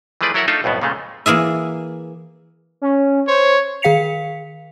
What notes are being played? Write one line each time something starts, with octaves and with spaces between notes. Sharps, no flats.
E3 F3 A3 G#4 B4 D5
F#3 E4 A4 A#4 E5 F#5
A3 D4 D#4 F4 A4 E5
B1 F2 A2 B3
A#2 C#3 G#3 A3
E3 A#3 G#4 E5
C#4
C5 C#5
D#3 G#4 F5 B6 C#7 F7